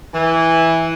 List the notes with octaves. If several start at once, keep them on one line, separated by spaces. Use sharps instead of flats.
E3